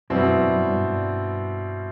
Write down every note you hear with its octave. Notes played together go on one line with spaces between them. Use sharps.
F#2 B2 G3 C4 E4
F#2
G2